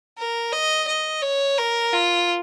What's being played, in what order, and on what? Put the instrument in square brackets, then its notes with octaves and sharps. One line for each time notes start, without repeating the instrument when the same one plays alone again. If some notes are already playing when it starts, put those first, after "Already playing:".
[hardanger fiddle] A#4
D#5
D#5
C#5
A#4
F4